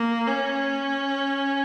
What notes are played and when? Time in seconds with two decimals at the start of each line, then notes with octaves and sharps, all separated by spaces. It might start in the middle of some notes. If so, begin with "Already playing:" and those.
Already playing: A#3
0.27 C#4